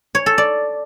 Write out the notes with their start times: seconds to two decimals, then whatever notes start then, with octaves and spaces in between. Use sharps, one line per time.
0.15 C#5
0.26 A4
0.38 D5